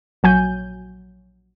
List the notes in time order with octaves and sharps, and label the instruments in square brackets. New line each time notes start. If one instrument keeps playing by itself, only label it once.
[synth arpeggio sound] A#1 F#3 G#5 G6